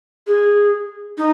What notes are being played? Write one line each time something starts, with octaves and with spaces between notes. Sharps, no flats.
G#4
D#4